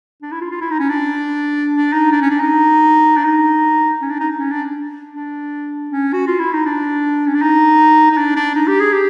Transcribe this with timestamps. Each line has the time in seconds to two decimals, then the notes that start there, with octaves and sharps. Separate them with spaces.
0.22 D4
0.32 E4
0.41 F4
0.51 F4
0.61 E4
0.70 D#4
0.79 C#4
0.89 D4
1.73 D4
1.93 D#4
2.12 D4
2.21 C#4
2.30 D4
2.40 D#4
3.17 D4
3.25 D#4
4.01 C#4
4.10 D4
4.20 D#4
4.38 C#4
4.51 D4
5.14 D4
5.90 C#4
6.13 F#4
6.27 F4
6.39 E4
6.53 D#4
6.65 D4
7.27 C#4
7.34 D4
7.42 D#4
8.11 D#4
8.17 D4
8.36 D4
8.55 D#4
8.67 G4
8.80 G#4
8.93 G4